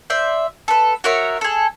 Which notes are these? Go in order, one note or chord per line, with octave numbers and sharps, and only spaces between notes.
C5 D5 E5
A4 B4
F#4 A#4 C#5 E5
G#4 A4